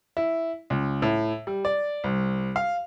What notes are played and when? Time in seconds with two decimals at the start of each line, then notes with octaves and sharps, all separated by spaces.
0.17 E4
0.70 C#2
1.02 A2
1.47 G3
1.65 D5
2.04 C2
2.56 F5